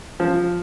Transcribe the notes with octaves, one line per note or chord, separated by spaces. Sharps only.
F3